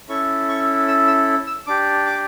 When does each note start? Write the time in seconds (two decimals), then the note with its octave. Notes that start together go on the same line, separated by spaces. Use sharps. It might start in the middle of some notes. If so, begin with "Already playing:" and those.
0.09 C#4 E4 A4 C#6
0.49 C#6
0.88 E6
1.07 E6
1.47 E6
1.67 D4 G4 D6
2.06 D6